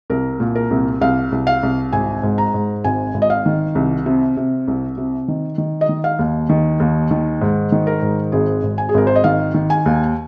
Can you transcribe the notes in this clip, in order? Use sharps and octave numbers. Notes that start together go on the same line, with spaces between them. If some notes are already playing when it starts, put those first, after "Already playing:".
C2 A#4
A#2
A#4
C2
C2 F5
C2
F5
C2
G#1 G#5
G#2
A#5
G#2
G#1 G#5
G#1
D#5
F5
D#3
C2
C3
C3
C2
C3
D#3
D#3
D#5
D#3
F5
D#2
D#3
D#2
D#3
G#2
D#3
A#4
G#2
G#1 G#4
G#1
G#5
G#4
G#1 A#4
C5
D#5
D#3 F5
D#3
G#5
D#2